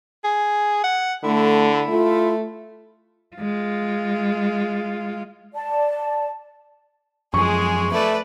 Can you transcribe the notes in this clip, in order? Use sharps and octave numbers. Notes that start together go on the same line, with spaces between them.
G#4
F#5
D3 A3 E4
A3 F4
G#3 F4
D5 A5
F#2 F3 G#3 G#4 C#6
A3 B4 D5